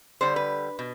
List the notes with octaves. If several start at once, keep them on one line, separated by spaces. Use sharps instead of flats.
D3 G3 C5
B4
B2